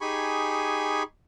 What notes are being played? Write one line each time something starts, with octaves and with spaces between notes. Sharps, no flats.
D#4 G4 G#4 G#5 B5 C#6